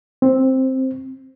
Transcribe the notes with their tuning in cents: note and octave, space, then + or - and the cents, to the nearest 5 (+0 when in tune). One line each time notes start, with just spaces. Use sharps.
C4 +5